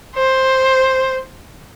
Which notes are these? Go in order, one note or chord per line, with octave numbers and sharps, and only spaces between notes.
C5